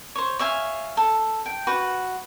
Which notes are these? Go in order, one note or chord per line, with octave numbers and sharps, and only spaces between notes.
C5 C#5
C#5 E5 F5 G#5
A4
G5
F#4 B4